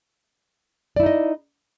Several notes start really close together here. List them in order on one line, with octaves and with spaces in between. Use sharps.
D5 E4 D#4 D#5